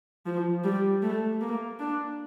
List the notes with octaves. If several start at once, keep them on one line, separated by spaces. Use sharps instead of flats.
F3
G3
A3
A#3
D4